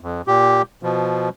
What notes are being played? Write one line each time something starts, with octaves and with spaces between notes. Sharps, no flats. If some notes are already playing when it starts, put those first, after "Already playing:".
F2
A#2 G4
B2 F3